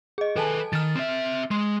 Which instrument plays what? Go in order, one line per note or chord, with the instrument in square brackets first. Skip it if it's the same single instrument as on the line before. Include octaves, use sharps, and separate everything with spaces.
[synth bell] G#4 D#5
[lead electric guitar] D#3 B4 [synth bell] A4 G#5 A5
[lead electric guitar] D#3 [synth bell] F6 A6
[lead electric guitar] C4 E5
[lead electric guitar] G#3 [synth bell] C6